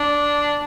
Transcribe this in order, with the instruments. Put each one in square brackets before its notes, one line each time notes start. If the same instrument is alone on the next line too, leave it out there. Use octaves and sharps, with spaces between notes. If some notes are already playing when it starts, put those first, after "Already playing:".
Already playing: [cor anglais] D4